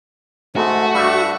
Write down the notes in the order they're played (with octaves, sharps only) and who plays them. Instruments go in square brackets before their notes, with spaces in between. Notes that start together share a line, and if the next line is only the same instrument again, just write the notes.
[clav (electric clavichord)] G#2 [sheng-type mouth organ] A3 [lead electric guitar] F#4
[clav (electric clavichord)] G2 G3 A3 [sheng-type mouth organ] E5 C#6